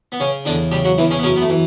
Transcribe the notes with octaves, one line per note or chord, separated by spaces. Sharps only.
B3
C#3 C#4
E2 D3 D4
C#3 G3 G4
F#3 F#4
E2 E3 E4
C#3 C#4
B3
F#2 C#3 C#4
B3
A3
E3